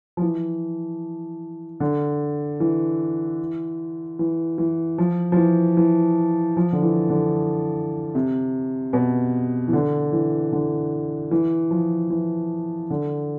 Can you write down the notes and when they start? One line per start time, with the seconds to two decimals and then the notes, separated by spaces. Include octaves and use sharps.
0.17 F3
0.22 E3
1.80 D3
2.60 E3
4.19 E3
4.58 E3
4.98 F3
5.32 F3
5.37 E3
5.77 E3
6.57 F3
6.73 D3
6.82 E3
7.10 D3
8.15 C3
8.93 B2
9.68 E3
9.73 D3
10.12 E3
10.52 D3
11.31 E3
11.71 F3
12.10 E3
12.90 D3